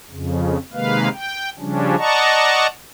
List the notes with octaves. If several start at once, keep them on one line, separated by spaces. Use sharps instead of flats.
F2 C#3
C3 D#3 G#3 A#3 B4 F5
G5
C#3 F3 G3 C#4 D4
D5 D#5 F#5 A5 A#5 C#6